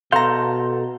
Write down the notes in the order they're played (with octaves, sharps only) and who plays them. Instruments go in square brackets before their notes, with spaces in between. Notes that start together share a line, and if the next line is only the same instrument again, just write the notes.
[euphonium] B2 [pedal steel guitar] A4 G6 [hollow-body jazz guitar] F5 A#5 [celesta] C6